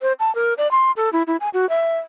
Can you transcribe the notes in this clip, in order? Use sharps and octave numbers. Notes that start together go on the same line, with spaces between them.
C5
A5
A#4
D5
C6
A4
E4
E4
G#5
F#4
E5